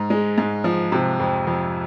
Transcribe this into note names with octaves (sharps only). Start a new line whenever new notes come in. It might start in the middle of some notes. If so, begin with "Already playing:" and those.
Already playing: G#2
G#3
G#2
F3
C3
F2
F2